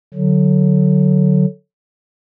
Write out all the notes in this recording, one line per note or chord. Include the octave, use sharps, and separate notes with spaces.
D3 F#3